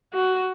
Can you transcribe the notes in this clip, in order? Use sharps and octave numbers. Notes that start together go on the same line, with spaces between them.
F#4